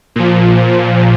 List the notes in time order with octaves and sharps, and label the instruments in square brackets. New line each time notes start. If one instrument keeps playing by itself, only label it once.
[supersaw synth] A#2 F3